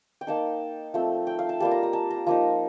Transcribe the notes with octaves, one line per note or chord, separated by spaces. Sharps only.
G5
A#3 D#4 A5
F3 A3 C4
G5
F5
A5
G3 A#3 F4 A5
A#5
A#5
A5
A#5
F3 A#3 D#4